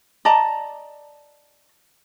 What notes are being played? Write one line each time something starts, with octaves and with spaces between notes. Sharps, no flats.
D5 D#5 A5 A#5